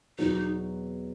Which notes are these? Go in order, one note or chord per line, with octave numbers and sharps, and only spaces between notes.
E2 B2 F#3 D#4